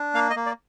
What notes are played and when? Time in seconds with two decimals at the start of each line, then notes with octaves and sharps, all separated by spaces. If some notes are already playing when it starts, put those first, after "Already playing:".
Already playing: D4
0.14 A#3 F5
0.30 D#5
0.36 A#3
0.46 D5